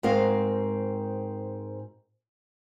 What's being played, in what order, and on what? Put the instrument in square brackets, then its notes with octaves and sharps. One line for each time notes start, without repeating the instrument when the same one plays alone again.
[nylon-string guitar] G#2 C4 F#4 A#4 F5